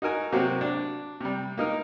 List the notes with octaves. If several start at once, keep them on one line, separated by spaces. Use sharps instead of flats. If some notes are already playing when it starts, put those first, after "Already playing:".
D#4 F#4 A#4 G#5
C3 F#3 A#3 C4 F#4 G4
D4
C3 G3
A#3 D#4 A#4